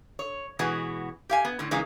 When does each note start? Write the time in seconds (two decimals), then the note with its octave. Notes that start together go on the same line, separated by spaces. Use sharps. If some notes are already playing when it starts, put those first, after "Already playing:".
0.19 C#5
0.59 B2 E3 G#3 B3 F#4
1.29 G4 F5 G#5
1.45 B3
1.59 A2 D3
1.71 C#3 E3 G#3 A#3 D#4